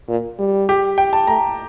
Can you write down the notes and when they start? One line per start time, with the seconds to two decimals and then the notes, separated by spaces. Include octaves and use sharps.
0.09 A#2
0.39 G3
0.69 G4
0.98 G5
1.13 A5
1.27 A3 A#5